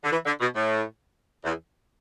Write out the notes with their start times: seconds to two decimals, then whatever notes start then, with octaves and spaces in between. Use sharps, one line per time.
0.04 D3
0.11 E3
0.26 D3
0.40 B2
0.55 A2
1.44 E2